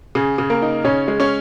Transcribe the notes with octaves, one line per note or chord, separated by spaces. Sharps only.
C#3 G#4
C#3
A#3 A#4
D#4
C#3 C#4 C#5
G#3
C#4 C#5